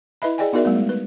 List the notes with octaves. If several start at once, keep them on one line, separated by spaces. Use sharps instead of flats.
E4 B4 D#5 E5 B5
G#4 D5 D#5 G5 G#5
B3 D#4 F#4 A#4 D5 E5
G3 A3 B3
G#3
B4